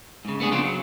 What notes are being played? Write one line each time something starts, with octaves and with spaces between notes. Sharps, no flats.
G#2 C#3
A3 B3 D4 G#4
C#3 F3 B3 C4 D4 F4
F#3